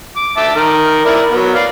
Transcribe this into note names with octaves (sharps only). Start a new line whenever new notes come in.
D6
E5 A5 D6
D#3 A#4
E4 A#4 D5
F#3 B3
D5 F5